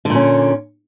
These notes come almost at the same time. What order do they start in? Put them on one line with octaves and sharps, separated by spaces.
D3 A#2 C#4